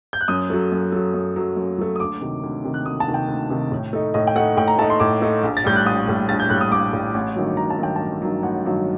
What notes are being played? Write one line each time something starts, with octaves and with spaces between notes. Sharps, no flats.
G6
F#6
F#2 D#6
F#3 A3
F#2
F#3 A3
F#2
F#3 A3
F#2
F#3 A3
D#6
D2 D6
C3 D#3
D2
C3 D#3
F#6
D2 D#6
A5
C3 D#3
G5
D2
C3 D#3
A2
A3 D#4
A2 D#5
G5
A3 D#4 F#5
A2 G5
A#5
A3 D#4 A5
C6
A2 D6
A3 D#4
A#1
A6
A2 G3 G6
F#6
A#1 D#6
A2 G3
A#1 A6
G6
A2 G3 F#6
D#6
A#1 D6
A2 G3
A1
G2 D#3 F#3
A1 A#5
A5
G2 D#3 F#3 G5
A1 A5
G2 D#3 F#3
A1 F#5
G2 D#3 F#3